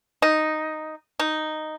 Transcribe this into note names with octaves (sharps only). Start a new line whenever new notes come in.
D#4
D#4